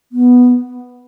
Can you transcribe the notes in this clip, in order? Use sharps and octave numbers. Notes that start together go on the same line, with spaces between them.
B3